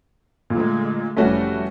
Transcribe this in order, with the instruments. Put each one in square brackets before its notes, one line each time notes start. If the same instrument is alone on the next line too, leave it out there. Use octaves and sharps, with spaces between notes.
[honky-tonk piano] A#2 [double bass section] D3 G#3 A3
[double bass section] F1 E3 G3 [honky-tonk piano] A3 C#4 F#4